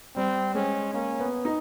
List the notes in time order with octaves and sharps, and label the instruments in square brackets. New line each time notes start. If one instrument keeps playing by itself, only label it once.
[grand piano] G3 [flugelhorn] C4
[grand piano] G#3 [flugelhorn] C#4
[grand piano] A#3 [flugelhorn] C#4
[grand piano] B3
D#4